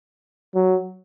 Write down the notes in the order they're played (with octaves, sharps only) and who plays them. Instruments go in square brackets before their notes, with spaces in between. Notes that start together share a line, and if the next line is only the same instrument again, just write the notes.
[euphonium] F#3